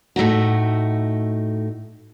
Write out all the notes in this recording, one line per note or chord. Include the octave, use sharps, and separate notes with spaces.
A2 A3 D#4 F#4